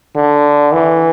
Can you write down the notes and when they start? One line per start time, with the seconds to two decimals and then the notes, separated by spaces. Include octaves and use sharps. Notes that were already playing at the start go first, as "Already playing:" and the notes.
0.16 D3
0.72 E3